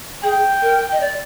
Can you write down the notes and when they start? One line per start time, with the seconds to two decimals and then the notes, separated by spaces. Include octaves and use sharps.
0.23 G#4 G5
0.62 A#4
0.92 D#5
1.01 D5